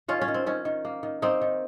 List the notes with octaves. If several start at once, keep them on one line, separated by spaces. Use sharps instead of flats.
D#3 C#4 F4
C#4
D#3
C4
D#3 C#4
D#3
A#3
D#3
A#3 C4 D#4
D#3